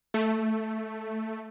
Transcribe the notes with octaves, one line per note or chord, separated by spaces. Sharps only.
A3